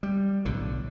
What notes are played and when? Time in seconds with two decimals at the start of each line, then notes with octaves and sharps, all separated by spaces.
0.03 G3
0.45 B1 A2 D3